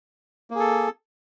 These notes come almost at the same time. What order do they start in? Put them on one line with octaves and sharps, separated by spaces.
A#3 G#4 A4